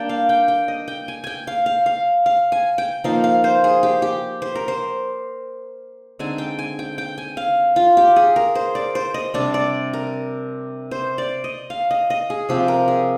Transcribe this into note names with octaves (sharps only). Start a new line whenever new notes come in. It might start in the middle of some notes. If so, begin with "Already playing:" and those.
Already playing: G3 A#3 D4 G5
F5
G5
G5
D#5
G5
G#5
G5 G#5
F5
F5
F5
F5
G#5
G5
F3 A#3 D#4 F5
F5
C5
G#4
G4
G4
C5
A#4
C5
D3 G#3 C4 D#4 G#5
G5
G#5
G5
G5
G#5
F5
F4
G4
G#4
A#4
C5
D5
C5
D#5
C3 G3 D4 D5
D5
A#4
C5
D5
D#5
F5
D#5
D#5
G#4
C3 F3 C4 G4
A#4
G#4